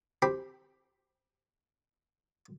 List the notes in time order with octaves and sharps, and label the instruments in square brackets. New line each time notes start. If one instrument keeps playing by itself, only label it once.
[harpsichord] C4 G4 B5